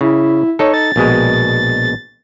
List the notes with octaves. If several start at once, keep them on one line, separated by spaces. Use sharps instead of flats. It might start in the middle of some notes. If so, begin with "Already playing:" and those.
C#3 E4
D#4 A4 C#5
A6
A#1 B2 G#3